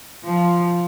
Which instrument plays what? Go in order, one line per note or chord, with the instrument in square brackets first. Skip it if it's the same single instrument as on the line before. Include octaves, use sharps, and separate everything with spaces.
[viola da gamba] F3